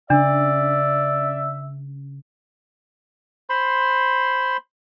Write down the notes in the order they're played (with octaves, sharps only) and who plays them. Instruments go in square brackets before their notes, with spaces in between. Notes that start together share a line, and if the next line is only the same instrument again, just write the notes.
[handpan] C#3 [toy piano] D4 [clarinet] D5 [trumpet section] E5
[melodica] C5 B5 C6